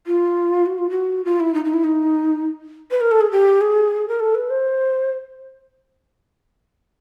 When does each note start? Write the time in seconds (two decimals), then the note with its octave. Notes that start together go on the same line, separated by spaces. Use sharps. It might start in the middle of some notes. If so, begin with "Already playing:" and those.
0.07 F4
0.66 F#4
0.78 F4
0.90 F#4
1.25 F4
1.40 E4
1.54 D#4
1.65 D#4
1.74 E4
1.84 D#4
2.91 B4
3.01 A#4
3.11 A4
3.21 G#4
3.31 G4
3.61 G#4
4.08 A#4
4.20 A4
4.35 B4
4.50 C5